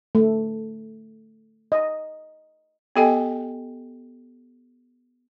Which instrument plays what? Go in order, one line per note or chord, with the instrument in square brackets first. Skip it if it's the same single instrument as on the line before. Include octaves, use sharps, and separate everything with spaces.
[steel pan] A3
D#5
[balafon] B3 G4 A4 D#5 G5 G#5